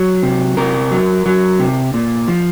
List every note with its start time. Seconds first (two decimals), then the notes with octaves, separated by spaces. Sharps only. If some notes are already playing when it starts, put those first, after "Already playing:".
Already playing: F#3 C#5
0.23 C3
0.57 C3 A#4
0.91 F#3
1.26 F#3
1.59 C3
1.94 A#2
2.28 F3